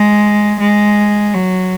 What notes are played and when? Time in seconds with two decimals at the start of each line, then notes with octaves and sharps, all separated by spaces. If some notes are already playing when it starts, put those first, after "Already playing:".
Already playing: G#3
0.60 G#3
1.34 F#3